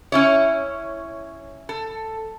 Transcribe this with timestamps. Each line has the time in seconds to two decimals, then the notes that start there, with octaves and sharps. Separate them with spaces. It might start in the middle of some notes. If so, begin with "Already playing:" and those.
0.12 C#4 E4 C#5
1.69 A4